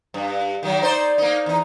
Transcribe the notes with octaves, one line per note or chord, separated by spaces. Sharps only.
G2
D#3 F#3
D#4 C5 D5
A#3 D#4
E2 D#4